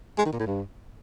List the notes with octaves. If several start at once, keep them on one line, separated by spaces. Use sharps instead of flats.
G#3
D#3
A#2
A2
G2